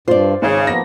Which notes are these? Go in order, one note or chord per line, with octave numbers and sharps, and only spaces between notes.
G2 F4 C5 D5
G#1 C#3 G#4
F3 A#3 B3 A#6